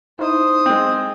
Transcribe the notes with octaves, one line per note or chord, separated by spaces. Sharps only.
D#4 E4 C5 D#6
G#3 C4